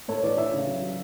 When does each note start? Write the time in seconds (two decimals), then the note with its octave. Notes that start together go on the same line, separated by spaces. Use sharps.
0.08 A2 A4 C#5
0.23 E3 B4 D5
0.37 E3 C#5 E5
0.53 C#3
0.67 F#3
0.82 F#3